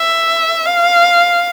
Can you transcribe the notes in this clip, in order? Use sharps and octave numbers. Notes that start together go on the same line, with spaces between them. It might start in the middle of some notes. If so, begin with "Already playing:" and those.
Already playing: E5
F5